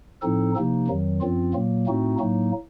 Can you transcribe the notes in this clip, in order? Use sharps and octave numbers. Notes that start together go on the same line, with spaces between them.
A2 F3 C4 D#4 A4
C3 F3 A#3 D#4
F2 D#3 F#3
F#2 F3 C4 F4
A#2 F#3 A#3
A2 A3 C4 D#4 F#4
A2 F#3 A#3 D#4